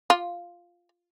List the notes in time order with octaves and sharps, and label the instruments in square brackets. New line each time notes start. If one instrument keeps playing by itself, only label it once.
[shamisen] F4